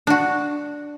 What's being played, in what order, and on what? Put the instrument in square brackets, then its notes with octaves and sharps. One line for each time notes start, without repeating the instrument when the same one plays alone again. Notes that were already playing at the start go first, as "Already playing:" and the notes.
[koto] D4 F#4